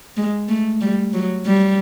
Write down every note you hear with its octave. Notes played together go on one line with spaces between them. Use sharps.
G#3
A3
G3
F#3
G3